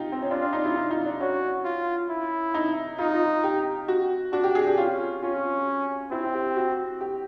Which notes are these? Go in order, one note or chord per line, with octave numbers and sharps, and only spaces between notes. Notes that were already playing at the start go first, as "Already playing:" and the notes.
Already playing: D#4 F4 G4
C4
C#4
D4 F4
D4
D#4
E4
D#4
D#4
D4
C#4 F#4
F4
E4
D#4
D#4 F4
F4
G4
F#4
D4 F#4
G4
G#4
G4
C#4 F4
C#4 F4
C4 E4
G4
F#4
G4